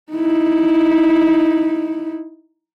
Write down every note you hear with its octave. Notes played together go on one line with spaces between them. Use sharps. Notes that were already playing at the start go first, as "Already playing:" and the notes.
D#4 E4